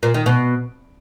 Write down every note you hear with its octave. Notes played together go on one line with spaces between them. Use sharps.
A#2
D#3
B2